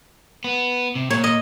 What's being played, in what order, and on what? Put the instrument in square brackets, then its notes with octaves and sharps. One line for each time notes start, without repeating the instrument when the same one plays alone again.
[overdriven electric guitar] B3
C3
[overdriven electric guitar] A#2 [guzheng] C#5
[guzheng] D#5